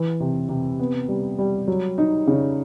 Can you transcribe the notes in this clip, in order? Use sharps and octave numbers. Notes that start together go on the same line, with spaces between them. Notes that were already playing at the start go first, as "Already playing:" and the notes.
Already playing: E3
C3
C3
B3
G3
G3
F#3
D#4
C#3